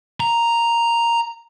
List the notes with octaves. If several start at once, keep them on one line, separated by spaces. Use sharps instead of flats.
A#5